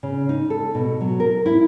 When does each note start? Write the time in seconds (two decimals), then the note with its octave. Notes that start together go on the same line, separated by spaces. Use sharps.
0.03 C#3
0.29 D#4
0.50 A4
0.75 B2
1.01 F#3
1.20 A#4
1.46 E4